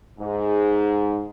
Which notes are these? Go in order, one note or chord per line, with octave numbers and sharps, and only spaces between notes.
G#2